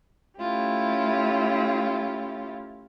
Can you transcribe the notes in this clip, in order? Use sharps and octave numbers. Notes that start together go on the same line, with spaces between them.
A3 C#4 E4 F4 G4